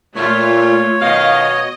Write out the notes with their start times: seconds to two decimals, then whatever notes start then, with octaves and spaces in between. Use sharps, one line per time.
0.16 A#2 A3 F4 C#5
1.01 F#2 B2 D#3 D#5 F5